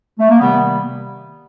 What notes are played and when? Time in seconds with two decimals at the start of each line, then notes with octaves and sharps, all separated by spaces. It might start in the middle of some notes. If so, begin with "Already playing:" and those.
0.19 A3
0.30 A#3
0.40 C3 D#3 G3 B3